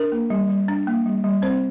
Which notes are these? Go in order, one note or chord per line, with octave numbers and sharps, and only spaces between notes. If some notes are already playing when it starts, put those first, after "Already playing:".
Already playing: D4 A#4
A#3
G3
G3
D4
A#3
G3
G3
C4 C5